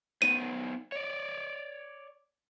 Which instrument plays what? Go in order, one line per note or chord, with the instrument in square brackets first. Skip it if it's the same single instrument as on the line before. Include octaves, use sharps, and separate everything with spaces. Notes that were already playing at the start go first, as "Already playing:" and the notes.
[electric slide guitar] B3 D#4 C5 [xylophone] D#7
[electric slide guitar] C#5 D5